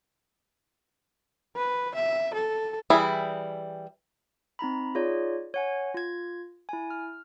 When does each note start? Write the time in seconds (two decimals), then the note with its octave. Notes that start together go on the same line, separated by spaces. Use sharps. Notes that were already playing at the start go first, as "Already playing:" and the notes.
1.56 B4
1.94 E5
2.34 A4
2.90 E3 G3 E4 G#4
4.59 C4 D#4 A#5 B5
4.95 D#4 F4 G#4 C#5 D5
5.54 C#5 F#5 G#5
5.94 F4 G#6
6.69 E4 G#5
6.90 F6